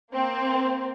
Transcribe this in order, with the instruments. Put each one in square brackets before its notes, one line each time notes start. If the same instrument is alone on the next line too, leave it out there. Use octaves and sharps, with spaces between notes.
[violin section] A#3 C4